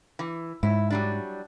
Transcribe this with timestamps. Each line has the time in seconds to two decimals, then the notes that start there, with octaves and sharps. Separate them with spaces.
0.19 E3
0.63 G#2 E4
0.90 F#3 G3 D4